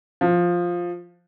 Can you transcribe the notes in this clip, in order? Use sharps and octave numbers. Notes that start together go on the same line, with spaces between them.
F3